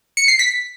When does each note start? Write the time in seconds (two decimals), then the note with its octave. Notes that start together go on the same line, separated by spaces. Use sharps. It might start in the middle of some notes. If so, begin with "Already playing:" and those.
0.17 C#7
0.28 C7
0.39 B6